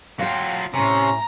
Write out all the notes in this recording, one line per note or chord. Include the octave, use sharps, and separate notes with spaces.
F#3 F4 F5 G5
A2 C3 C#4 G#5 A#5